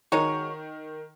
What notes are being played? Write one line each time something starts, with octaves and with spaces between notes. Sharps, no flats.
D#3 G#3 D#4 F#4 C#5